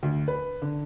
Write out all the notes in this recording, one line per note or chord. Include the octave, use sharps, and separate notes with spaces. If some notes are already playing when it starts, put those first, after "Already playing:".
D2
B4
D3